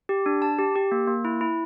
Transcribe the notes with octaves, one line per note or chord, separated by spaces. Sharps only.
G4
D4
A5
G4
G4
A#3
A#3
E4
E4